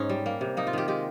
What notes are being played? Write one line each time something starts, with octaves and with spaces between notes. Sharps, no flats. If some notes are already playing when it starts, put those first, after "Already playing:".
Already playing: G#2 C#4 D#4
G3
A#3
C3
A#3 D#4
F4
D#3 G4
G#3 G4